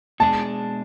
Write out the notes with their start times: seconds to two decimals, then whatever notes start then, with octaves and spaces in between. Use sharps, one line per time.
0.20 B2 G#3 D4 G#4 A5